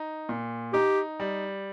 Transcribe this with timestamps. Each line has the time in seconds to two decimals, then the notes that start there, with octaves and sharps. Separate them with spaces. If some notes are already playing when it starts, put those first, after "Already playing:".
Already playing: D#4
0.29 A#2
0.73 D#4 G4
1.20 G3